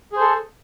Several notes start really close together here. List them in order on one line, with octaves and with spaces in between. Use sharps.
G#4 C5 A4